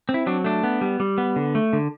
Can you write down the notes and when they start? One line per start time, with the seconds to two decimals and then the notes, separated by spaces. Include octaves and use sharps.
0.09 C4
0.14 E4
0.27 F#3 D4
0.44 A3 D4
0.64 B3
0.81 G3
1.00 G3
1.18 B3
1.36 D3
1.55 A3
1.73 D3